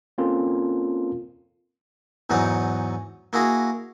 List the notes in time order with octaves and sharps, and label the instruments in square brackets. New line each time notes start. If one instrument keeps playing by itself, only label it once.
[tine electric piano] A#3 C4 C#4 F4 A4 A#4
[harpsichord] E2 G#2 E3 F#3 D#4 F#5
A#3 E4 F#4 G#4 A#5